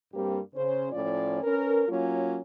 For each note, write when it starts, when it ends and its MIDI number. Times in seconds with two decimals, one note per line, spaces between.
0.14 0.39 43
0.14 0.39 55
0.14 0.39 58
0.14 0.39 60
0.14 0.39 67
0.55 0.88 49
0.55 0.88 61
0.55 0.88 72
0.92 1.41 45
0.92 1.41 53
0.92 1.41 61
0.92 1.41 65
0.92 1.41 74
1.43 1.84 61
1.43 1.84 70
1.43 1.84 71
1.88 2.40 54
1.88 2.40 58
1.88 2.40 61
1.88 2.40 65